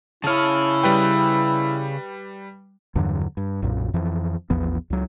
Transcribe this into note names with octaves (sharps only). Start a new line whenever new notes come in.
C#3 E4 C#5 A5 F6
G3 B4 G5
E2 G2 D3 F#3
G2
B1 F#2 A#2
F2 E3 F3
A#1 E2 F3 B3
C#2 F#3